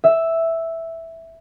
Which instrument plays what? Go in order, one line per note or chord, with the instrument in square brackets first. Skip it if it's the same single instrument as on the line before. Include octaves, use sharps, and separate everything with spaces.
[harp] E5